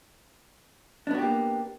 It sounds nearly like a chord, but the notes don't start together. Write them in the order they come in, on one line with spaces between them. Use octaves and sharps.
D4 B3 F#4 G4 A#3